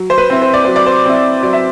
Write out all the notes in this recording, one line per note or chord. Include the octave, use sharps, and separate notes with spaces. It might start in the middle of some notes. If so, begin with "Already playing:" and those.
Already playing: F#3
C5
B4
C4 E4
C5
D5
F#3 C5
D5
C5
C4 E4
F#3 D5
E5